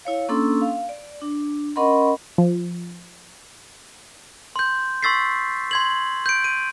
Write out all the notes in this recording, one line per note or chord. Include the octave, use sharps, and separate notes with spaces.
E4 C#5 F5
A#3 C#4 D4 A4 C6 E6
F5
D5
D4
C#4 A#4 D#5 F#5 B5 C6
F3
C6 G6
C6 C#6 E6 A6 B6 C7
C6 G#6 F#7
G6 D7
D#7